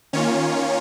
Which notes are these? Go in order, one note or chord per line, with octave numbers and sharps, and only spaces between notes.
D#3 A#3 C#4 F4 C#5